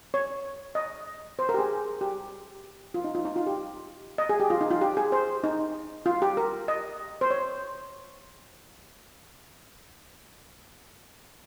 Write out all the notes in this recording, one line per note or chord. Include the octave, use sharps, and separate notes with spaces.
C#5
D#5
C5
A#4
G4
G#4
G4
F4
D#4
F4
D#4
F4
G4
D#5
G#4
G4
F4
D#4
F4
G4
G#4
C5
D#4
F4
G4
A#4
D#5
C5
C#5